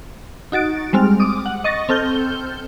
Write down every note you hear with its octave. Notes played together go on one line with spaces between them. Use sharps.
D#4 F#4 A6 D7
G3 G#3 C4 F6
D6 D#6
F#5
D#5 C#6 A6 A#6
C4 A4 F6 G6 G7